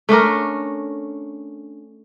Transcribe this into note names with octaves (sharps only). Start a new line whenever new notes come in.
A3 C#4 D4 A#4